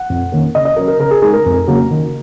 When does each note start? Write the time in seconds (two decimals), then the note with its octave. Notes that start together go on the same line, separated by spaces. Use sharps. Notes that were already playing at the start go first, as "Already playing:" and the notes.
Already playing: F#5
0.10 F2
0.32 D#3 A#3 C#4
0.55 C#3 D#5
0.65 D#5
0.76 F#3 C#4 A#4
0.88 A#4
0.99 C#3 A#4
1.11 G#4
1.22 G#3 D#4 G#4
1.34 A#4
1.46 F2
1.68 C#3 F#3 A#3
1.90 D#3